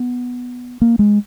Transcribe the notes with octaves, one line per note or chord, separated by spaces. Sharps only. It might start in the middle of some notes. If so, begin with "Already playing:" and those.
Already playing: B3
A#3
G#3